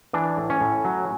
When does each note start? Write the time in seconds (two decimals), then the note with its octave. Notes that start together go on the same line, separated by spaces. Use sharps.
0.13 E3 D4
0.37 A2
0.50 C#4
0.61 A2
0.85 F#3